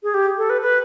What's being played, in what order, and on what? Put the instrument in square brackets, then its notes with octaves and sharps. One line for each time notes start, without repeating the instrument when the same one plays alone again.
[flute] G#4
G4
A4
B4
B4